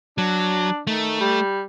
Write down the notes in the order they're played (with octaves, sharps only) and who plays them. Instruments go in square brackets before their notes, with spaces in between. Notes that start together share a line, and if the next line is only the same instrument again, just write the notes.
[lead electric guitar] F#3 [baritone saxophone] D4
[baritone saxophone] D#3 [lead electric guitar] A3
[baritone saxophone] G3